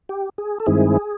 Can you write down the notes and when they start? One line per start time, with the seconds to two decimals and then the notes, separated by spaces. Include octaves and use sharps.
0.09 G4
0.38 G#4
0.60 A4
0.66 G2 D#3 G#3 C4 E4 G#4